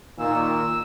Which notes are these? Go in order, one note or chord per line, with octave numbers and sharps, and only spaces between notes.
A#2 D#3 E6